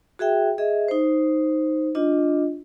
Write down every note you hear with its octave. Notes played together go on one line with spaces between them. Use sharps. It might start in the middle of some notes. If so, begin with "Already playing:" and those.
F#4 G#4 E5 G5
G#4 D#5 E5
D#4 C5
D4 F4 D#5